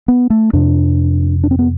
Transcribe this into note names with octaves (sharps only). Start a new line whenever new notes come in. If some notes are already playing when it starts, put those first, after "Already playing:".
B3
A3
F2 C3 D4
D4
C4
B3